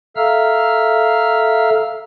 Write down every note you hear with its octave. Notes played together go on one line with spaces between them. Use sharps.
A4 E5 F5 A#5 E6 F6